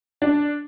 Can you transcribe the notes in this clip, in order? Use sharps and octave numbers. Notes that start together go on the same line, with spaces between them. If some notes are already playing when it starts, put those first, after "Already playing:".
D4